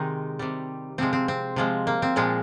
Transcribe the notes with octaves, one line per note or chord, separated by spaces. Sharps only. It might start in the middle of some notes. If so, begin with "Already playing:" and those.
Already playing: C3 D#3 G#3 D#4
C3 G3
C3 F3 G#3 C4
C4
C4
C3 F3 G#3
A#3
C4
A#2 F3 G#3